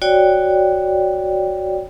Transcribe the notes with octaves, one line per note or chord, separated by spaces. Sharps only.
F#4 C#5 D5 G5